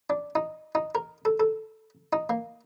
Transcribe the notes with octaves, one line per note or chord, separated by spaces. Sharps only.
D4
D#4
D#4
A#4
A4
A4
D#4
A#3